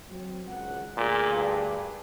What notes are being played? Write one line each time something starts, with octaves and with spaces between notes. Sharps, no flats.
F#3 C4
G#1 C#2 F#5
D2 A#2 G#4
G2